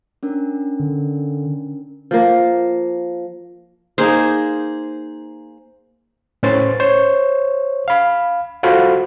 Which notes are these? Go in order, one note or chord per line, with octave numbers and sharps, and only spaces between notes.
C#4 D4 A#4
D3
F3 A#3
A#3 D#4 G#4 C5
A2 C#4 B4 C5 A6
C5 C#5 G6
F5 B5
F4 F#4 A4 C5 F5 B5